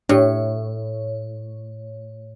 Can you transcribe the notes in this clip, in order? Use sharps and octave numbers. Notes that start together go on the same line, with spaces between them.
A2 D4 G4 C#5